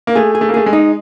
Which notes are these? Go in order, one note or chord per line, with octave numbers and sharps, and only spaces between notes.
A#3
A3 G#4
G#4
A3
A#3
A3 G#4
G#3
D#4